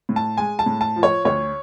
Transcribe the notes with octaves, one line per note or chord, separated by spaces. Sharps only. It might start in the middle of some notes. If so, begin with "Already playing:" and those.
A2
A5
G#3 G#5
A5
A2
A5
F3
C#5
D2 C#5